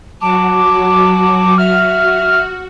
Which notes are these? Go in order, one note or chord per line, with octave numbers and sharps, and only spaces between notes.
F#3 F#4 A5 D6
F#4 E5 F6